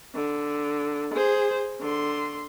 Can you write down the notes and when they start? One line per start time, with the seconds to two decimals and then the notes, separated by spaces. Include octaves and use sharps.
0.15 D3
1.14 G#4 C5
1.81 D3 C6